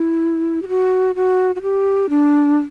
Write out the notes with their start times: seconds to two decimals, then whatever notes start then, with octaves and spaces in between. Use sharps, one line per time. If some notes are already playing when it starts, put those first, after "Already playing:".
Already playing: E4
0.62 G4
0.68 F#4
1.15 F#4
1.56 F#4
1.62 G4
2.09 D4